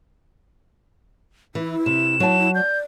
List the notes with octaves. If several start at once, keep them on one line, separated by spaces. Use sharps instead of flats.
E3 E4
C3 E7
F#3 E4 A5
E4
D5 G6